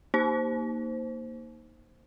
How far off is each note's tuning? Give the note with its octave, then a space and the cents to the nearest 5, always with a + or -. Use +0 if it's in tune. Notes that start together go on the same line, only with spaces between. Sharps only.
A#3 +0 D#4 +0 C5 +0